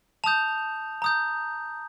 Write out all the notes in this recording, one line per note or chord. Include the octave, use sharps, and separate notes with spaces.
A5 D#6 G6 F7
A#5 D#6 G6